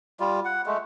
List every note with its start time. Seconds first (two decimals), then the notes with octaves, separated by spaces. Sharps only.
0.20 G3 F4
0.45 F#5
0.66 G#3 A3